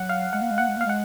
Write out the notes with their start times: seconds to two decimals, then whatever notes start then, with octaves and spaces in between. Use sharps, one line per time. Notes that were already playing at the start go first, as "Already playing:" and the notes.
Already playing: F#3 F#5
0.09 F5
0.33 G#3 F#5
0.42 A#3
0.51 G#3
0.58 A#3 F#5
0.68 G#3
0.77 A#3 F5
0.86 G#3 F#5